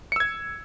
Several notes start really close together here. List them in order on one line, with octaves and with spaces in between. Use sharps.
C#7 E6 G#6